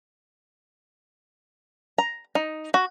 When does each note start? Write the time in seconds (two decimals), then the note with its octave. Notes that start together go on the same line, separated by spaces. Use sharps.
1.98 A#5
2.35 D#4
2.74 F#4